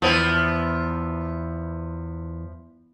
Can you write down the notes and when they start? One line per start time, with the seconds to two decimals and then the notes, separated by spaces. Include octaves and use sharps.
0.02 E2 F3 B3 E4